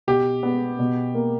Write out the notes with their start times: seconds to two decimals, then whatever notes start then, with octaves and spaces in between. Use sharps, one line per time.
0.07 B2 G4
0.43 B3
0.79 B2
1.14 A#3